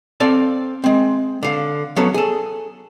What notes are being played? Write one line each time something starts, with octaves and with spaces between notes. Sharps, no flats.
C4 A4 D5 F5 A5
G#3 C4
D3 F5
F#3 B3 C#4 A4
G#4 A4